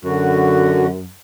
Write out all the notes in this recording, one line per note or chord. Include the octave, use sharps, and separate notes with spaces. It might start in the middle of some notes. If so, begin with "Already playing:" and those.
F#2 D3 F#4